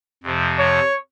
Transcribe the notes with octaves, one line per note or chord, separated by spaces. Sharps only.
F2 C3 F3
C#5